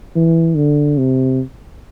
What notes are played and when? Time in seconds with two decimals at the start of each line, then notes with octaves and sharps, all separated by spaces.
0.15 E3
0.56 D3
0.98 C3